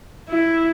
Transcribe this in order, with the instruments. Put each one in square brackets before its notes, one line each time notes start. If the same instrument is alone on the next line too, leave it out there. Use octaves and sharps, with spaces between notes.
[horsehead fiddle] E4